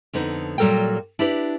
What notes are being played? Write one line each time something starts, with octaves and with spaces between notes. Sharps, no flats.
F2 D3 B3 D#4
A#2 F#3 G3 A4 A#4 G5
D4 E4 G4 B4